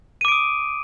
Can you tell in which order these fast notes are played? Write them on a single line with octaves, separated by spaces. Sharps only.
D#7 D6 D7 D#6